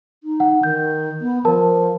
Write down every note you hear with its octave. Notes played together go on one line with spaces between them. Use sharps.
D#4
F#5
D#3 G6
B3
F3 A#4 A5